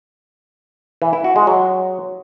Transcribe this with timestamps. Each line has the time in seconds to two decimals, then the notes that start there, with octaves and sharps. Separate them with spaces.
1.02 E3
1.13 E4
1.24 F#4
1.36 G#3
1.47 F#3